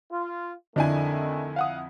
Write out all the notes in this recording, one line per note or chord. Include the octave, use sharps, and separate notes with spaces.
F4
F2 D3 D#3 A3 D4 E4 D#5 G#5
F5 F#5 D#6